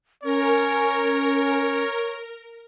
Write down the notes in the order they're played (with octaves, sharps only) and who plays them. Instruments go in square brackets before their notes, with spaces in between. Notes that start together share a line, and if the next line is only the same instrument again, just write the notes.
[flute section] C#4 [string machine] A#4 [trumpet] C#5